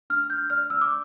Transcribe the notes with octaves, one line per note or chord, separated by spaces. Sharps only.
D4 F6
G6
D5 F6
E6
D6